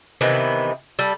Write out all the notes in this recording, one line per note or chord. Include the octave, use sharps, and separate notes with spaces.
C3 D#3 E3 B3
G3 A4